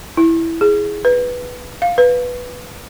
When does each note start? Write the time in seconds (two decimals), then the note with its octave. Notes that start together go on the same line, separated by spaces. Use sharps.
0.17 E4
0.61 G#4
1.05 B4
1.82 F5
1.98 B4